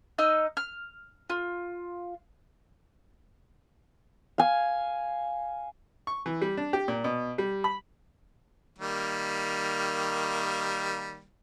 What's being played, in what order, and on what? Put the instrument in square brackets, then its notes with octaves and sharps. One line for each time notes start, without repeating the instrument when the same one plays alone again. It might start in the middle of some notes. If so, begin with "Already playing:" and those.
[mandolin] D#4 D#5 E6 F6
F6
F4
[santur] F5 G#5
[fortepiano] C#6
E3
G3
D4
G4
A#2
B2
G3
B5
[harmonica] D#3 G3 A#3